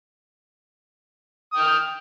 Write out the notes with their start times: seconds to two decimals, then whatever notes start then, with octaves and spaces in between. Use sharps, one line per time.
1.52 D#6
1.56 G5
1.60 F6